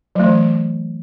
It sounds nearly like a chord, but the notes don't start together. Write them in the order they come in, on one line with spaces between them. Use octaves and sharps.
F#3 A3 E3